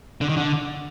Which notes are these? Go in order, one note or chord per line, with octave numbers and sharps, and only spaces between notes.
D3
D#3
D3